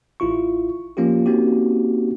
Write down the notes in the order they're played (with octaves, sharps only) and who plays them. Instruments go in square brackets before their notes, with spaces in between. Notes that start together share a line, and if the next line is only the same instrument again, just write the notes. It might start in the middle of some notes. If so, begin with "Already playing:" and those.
[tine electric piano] A1 E4 F4 C#6
F3 A#3 C#4 F4 G4
A#3 C4 C#4 D#4 F#4 G4